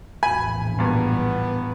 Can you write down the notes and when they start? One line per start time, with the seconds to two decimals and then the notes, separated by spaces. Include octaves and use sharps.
0.23 A#1 E2 A2 G#5 B5
0.79 G2 A#2 B3